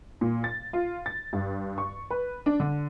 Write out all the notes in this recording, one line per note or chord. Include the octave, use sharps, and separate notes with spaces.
A#2
A6
F4
A6
G2
C#6
B4
D4
D3